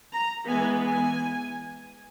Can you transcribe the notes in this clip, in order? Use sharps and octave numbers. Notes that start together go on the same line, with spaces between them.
A#5
E3 G#3 B3 G#5
G#5